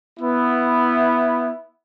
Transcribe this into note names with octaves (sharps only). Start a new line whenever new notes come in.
B3 E4